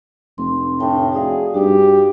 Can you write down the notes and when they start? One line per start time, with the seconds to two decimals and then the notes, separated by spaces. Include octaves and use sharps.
0.38 F1 C6
0.80 A2 D4 G5 A5
1.12 F#4 G#4 D5 F5
1.54 G2 D#4 F#4 G4